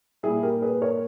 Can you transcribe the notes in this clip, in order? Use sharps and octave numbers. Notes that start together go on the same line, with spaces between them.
A#2 G3 E4 G#4
G4 A#4
G#4 B4
A#4 C#5